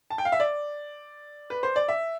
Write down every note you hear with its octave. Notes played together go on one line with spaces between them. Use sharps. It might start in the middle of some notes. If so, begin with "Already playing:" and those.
A5
G5
F5
E5
D5
B4
C5
D5
E5